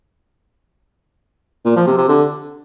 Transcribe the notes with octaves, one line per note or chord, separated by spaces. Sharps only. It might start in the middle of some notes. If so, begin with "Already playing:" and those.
A#2
F3
C3
C3
D3